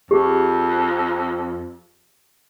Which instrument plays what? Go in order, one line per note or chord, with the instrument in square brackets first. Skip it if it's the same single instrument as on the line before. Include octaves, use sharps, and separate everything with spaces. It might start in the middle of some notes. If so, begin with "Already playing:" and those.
[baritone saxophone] F2 [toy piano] G4 G#4